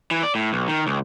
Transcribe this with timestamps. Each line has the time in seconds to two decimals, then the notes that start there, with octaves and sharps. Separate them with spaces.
0.11 E3
0.23 D5
0.35 A2
0.53 B1
0.68 D#3
0.87 C#2